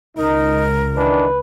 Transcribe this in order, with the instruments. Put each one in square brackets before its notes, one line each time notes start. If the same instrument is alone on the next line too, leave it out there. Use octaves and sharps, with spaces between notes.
[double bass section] C#2 [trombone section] D#4 [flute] A#4
[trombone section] D#3 E3 D4 [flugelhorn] B4